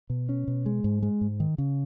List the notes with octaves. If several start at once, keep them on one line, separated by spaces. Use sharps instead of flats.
B2
C#4
B2
G#3
G#2
G#3
G#2
D#3
C#3